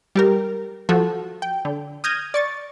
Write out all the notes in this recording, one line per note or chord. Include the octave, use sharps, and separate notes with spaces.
G3 G4 A#4
F3 F#4 A4
G5
D3
D#6 F6 G6 G#6 A#6 D#7
D5 C#6 A6